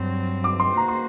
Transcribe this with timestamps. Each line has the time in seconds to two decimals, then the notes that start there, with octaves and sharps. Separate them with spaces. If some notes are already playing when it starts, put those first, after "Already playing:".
Already playing: G2 F#3 C4
0.44 D6
0.60 C6
0.77 A#3 F#4 C5 A#5
0.88 C6